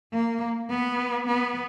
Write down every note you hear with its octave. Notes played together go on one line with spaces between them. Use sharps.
A#3
B3
B3